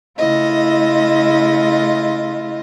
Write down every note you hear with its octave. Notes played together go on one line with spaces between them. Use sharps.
C#3 A3 E4 F4 D#5